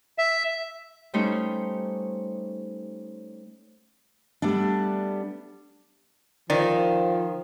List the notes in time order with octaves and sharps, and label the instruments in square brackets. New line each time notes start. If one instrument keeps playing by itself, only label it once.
[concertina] E5
[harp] G3 A3 C#4 D#4 C5 C#5
[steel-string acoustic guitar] G3 A3 B3 D4
[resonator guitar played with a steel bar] D#3 [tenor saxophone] F3 [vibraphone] C5 F5 G5 [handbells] D5